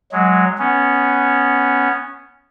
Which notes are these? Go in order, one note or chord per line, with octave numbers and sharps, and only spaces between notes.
F#3 G#3
B3 C#4